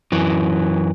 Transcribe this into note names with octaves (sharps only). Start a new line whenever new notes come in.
F#2 E3